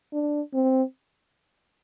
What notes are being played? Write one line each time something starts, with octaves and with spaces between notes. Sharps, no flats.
D4
C4